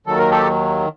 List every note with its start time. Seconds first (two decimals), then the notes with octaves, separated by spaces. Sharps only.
0.06 D#2 D#3 F#3 A4
0.18 A#4
0.31 G4 A4